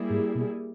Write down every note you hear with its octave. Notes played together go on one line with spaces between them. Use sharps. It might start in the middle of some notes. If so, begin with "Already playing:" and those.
Already playing: G3 A#3 E4 G#4
G#2
B2